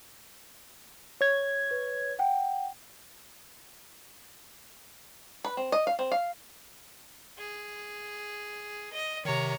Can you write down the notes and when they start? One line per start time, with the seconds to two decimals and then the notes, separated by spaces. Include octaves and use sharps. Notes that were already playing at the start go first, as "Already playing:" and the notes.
1.21 C#5 G#6
1.71 B4
2.19 F#5 G5
5.44 B4
5.57 C4
5.72 D#5
5.87 F5
5.99 C4
6.12 F5
7.38 G#4
8.92 D#5
9.25 C3 D#3 C#5 A#5